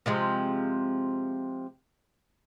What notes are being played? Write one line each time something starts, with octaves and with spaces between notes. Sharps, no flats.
C3 F3 G#3